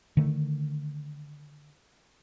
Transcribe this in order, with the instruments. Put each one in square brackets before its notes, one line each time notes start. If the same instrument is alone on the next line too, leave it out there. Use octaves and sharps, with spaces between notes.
[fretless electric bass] D3 D#3 A3